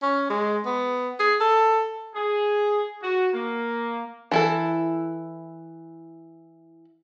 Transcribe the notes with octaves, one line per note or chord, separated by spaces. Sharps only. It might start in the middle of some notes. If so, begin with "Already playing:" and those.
C#4
G#3
B3
G#4
A4
G#4
F#4
A#3
E3 E4 A4